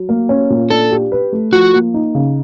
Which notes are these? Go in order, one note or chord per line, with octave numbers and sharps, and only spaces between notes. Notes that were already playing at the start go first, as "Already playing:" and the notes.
Already playing: F#3
A#3
C#4
A#2
D4 A4
G4
B4
A3
F3 F#4
A#3
D#4
C#3